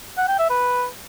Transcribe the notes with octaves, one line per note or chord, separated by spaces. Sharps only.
F#5
G5
E5
B4